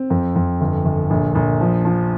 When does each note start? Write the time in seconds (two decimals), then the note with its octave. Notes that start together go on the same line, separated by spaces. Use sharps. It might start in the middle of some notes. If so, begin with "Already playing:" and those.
Already playing: C4
0.10 F2
0.36 F2
0.61 G1
0.85 G1
1.10 A#1
1.35 A#1
1.61 F3
1.85 F3